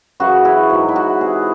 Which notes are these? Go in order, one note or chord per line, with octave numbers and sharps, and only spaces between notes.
F#2 C#3 E3 F#4
E4
G#2 D#3 F#3
E4
F#4
C3 E3 G#4